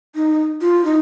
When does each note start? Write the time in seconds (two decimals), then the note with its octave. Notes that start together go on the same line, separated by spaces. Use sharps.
0.15 D#4
0.61 F4
0.85 D#4